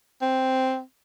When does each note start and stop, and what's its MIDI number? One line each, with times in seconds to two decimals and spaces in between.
0.22 0.81 60